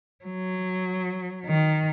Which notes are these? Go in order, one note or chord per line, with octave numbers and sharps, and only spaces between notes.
F#3
D#3